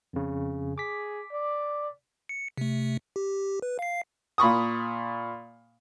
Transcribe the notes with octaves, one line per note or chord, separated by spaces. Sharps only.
F2 C#3
G#4 D6 B6
D5
C#7
C3 A3
G4
B4
F5 C7
A#2 B5 C#6 D#6